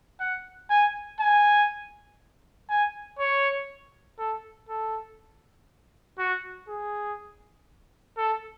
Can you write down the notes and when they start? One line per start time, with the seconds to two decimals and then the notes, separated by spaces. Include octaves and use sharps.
0.20 F#5
0.70 G#5
1.20 G#5
2.70 G#5
3.19 C#5
4.19 A4
4.69 A4
6.19 F#4
6.68 G#4
8.17 A4